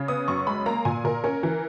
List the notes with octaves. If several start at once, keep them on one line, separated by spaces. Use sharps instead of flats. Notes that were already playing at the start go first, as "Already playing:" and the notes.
Already playing: C#3
B3 D#6
F#2 C#6
G#3 B5
A#3 A#5
A#2 G#5
A#2 A#4
C#4 A#4
E3